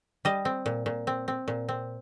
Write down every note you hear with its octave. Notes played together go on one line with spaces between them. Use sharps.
G3 D#5
C4
A#2
A#2
C4
C4
A#2
C4